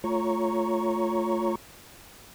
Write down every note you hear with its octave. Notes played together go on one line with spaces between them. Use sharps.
A3 F4 C#5 A#5 C#6